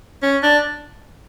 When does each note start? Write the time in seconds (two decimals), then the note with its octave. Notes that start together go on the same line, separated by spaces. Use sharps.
0.23 C#4
0.43 D4